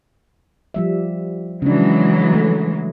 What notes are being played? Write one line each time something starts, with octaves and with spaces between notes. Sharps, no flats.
F3 G3 E5
C#3 E3 F#3 G#3 D4
A3